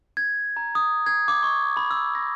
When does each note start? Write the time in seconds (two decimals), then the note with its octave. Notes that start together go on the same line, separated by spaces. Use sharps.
0.17 G#6
0.57 A#5
0.75 D#6
1.06 G#6
1.28 D6
1.43 C#6
1.77 B5
1.91 E6
2.15 A#6